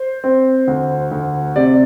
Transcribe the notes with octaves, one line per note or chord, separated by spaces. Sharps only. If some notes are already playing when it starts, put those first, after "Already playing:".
Already playing: C5
C4
D2
D2
C3 D5